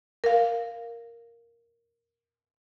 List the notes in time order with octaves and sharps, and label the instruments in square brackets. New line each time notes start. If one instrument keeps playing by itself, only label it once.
[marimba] A#4 F5